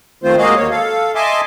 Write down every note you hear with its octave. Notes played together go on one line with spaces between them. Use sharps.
D#3 A3 C4 F4 C5
G#3 A#3 F#4 G#4 D#5 F5
D#2 A#3 C#5
A4 F5
D#5 E5 G#5 A5 C6 D6